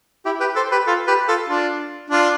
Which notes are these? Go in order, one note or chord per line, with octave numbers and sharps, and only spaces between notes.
E4 G4
G4 B4
A4 C5
G4 B4
F4 A4
G4 B4
F4 A4
D4 F4
D4 F4